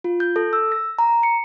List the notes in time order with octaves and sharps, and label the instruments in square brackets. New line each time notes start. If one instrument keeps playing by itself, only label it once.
[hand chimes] F4
G6
A4
E6
A#6
A#5
C#7